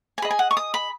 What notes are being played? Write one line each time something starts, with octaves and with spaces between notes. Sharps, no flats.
G#5
G#4 D#5 B5
G#5
F#5
C#6
D#6
B5